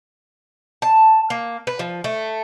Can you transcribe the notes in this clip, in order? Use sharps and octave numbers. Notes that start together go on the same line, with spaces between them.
A5
A#3
B4
F3
A3